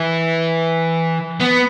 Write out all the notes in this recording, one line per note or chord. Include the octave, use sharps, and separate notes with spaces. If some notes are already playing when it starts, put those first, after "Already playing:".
Already playing: E3
B3